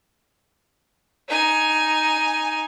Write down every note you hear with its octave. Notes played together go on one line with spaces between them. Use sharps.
D#4 G#5